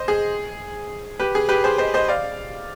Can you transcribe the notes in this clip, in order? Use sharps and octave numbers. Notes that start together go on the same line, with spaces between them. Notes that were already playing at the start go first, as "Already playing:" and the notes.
Already playing: C5 D#5
G#4
G4 B4
G#4
G4 B4
G#4 C5
C5 D#5
C5 D#5
D5 F5